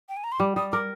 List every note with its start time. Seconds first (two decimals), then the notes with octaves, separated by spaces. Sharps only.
0.09 G5
0.17 G#5
0.24 A#5
0.32 C6
0.40 G3 D6
0.56 G3 D#6
0.72 A#4 D6